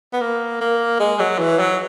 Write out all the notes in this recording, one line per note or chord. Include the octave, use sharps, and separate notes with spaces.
B3
A#3
A#3
G#3
F#3
E3
F#3